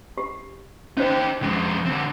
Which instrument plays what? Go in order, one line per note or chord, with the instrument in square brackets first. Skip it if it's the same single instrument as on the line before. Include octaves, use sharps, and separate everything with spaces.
[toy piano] G4
[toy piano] C#4 F#4 C5 [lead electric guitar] D#4 G4
[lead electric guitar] F2 G#3 [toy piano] C#4
[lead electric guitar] D3 C4